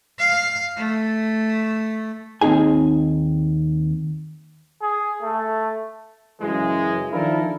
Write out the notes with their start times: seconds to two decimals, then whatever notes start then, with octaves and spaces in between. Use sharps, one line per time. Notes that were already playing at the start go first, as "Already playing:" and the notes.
0.19 F5
0.77 A3
2.41 D#2 C4 D#4 G#4 G#5
4.82 G#4
5.22 A3
6.41 F#2 C#3 E3 G#3
7.11 D#3 F3 D4 E4 A4 A#4